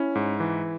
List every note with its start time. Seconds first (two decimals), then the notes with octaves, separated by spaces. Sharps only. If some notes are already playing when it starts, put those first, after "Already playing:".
Already playing: C#4 E4
0.15 G#2
0.40 E3